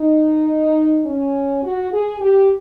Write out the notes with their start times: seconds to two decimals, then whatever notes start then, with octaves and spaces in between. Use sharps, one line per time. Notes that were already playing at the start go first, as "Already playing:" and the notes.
Already playing: D#4
1.05 C#4
1.63 F#4
1.92 G#4
2.21 G4